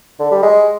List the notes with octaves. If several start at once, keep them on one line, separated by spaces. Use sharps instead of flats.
D3
G3
G#3